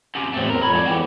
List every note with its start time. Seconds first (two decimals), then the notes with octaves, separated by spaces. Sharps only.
0.15 F#2 C3
0.34 E2 A2 F#3 A3 C4
0.50 A2 C4 A#4
0.62 F2 A4 C#5 B5
0.74 G#2 D5
0.86 E2 E3 F#4 G4